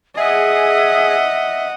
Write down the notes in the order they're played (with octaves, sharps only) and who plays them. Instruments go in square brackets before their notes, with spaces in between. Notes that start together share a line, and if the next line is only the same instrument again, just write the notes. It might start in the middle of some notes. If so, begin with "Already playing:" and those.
[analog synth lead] G#4 [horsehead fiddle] D#5 F#5 [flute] E5